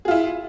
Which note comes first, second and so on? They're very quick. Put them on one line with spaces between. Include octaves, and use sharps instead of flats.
G#4 F4 E4